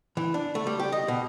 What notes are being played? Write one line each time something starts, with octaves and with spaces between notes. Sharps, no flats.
E3
D4
A3
G3
G4
D#5
B2